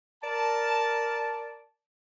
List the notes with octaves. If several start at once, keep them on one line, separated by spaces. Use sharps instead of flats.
A#4 D5 A5